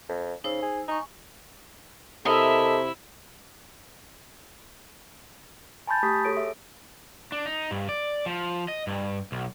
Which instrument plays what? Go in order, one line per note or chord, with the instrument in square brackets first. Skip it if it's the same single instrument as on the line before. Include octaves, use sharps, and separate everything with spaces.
[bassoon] F2
[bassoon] C#3 [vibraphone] D#4 C5 E6
[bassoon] G#4
[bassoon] D#4 [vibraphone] G#5 C#6
[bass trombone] C3 [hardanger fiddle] E4 E5 [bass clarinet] A4 [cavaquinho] A#4 D#5
[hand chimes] G#5 A5 B5 C6 G6 A6
A3 G4 D#6 B6
F#4 G#4 A4 C#5 D7
E5
[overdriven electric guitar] D4
D#4
G2
D5
F3
D#5
G2
B1